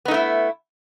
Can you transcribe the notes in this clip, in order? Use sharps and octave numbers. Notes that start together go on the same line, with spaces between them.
A3 B3 D#4 E4